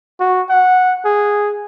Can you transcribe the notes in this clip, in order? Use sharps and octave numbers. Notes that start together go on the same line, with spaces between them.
F#4
F#5
G#4